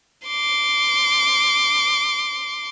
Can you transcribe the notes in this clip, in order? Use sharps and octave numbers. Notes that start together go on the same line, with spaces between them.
C6 D6